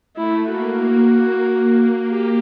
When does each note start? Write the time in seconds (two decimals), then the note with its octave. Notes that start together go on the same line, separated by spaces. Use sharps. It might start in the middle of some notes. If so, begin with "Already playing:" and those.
0.16 A3 E4
0.49 A#3 F#4
2.09 A#3 G4